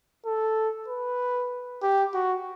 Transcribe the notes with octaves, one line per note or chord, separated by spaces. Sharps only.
A4
B4
G4
F#4